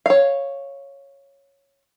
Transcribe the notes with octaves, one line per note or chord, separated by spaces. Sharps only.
C#5 F5